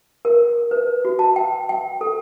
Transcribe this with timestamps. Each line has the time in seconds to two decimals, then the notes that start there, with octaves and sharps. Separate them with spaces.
0.25 A#4
0.71 B4
1.05 F#4
1.19 A5
1.36 G5
1.69 G5
2.01 A4